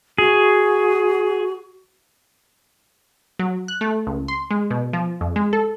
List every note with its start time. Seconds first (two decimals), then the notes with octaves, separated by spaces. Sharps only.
0.18 F#4 G#4
3.39 F#3
3.68 F#6
3.81 A3
4.07 C#2
4.28 C6
4.51 G#3
4.71 B2
4.93 F3
5.21 F2
5.36 G#3
5.53 A4